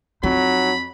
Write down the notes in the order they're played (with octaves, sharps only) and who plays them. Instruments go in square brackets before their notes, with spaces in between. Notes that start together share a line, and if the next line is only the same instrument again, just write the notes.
[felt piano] F2 [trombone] F#3 [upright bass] D#4 [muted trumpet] B5